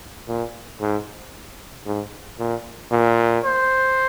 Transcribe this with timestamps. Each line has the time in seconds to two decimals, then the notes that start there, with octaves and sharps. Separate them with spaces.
0.28 A#2
0.81 G#2
1.86 G#2
2.39 A#2
2.92 A#2
3.44 C5